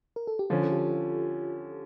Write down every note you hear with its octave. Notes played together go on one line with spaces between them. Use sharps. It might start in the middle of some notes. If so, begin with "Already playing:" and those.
A#4
A4
G4
D3 F3 C#4 F4
A4
G4
F4